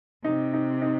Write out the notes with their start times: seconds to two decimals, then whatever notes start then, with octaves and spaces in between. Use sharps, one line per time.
0.24 C3 D#4
0.53 D#4
0.82 D#4